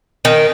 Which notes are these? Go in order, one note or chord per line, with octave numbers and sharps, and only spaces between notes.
D#3